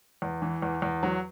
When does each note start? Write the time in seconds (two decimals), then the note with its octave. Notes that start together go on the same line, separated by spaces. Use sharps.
0.22 E2
0.42 E3
0.62 E2
0.82 E2
1.03 F#3